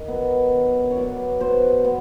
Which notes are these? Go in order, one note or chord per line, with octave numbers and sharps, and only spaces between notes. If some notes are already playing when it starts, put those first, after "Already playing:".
Already playing: D#3 D#5
F#3 B3
D#3
C#5
F#3 B3 D5
B2 C5
B3